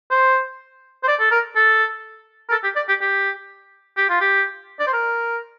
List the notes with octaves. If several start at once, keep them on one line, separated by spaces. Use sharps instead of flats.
C5
C5
D5
A4
A#4
A4
A#4
A4
G4
D5
G4
G4
G4
F4
G4
D5
C5
A#4